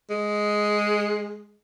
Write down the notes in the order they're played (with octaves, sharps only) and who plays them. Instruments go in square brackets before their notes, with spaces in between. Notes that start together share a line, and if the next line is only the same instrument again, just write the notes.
[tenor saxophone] G#3